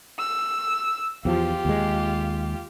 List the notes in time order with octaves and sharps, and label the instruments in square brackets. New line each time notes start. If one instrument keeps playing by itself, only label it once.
[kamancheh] E6
[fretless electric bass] E2 F3 [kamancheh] F4 G4
[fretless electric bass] D#2 G#3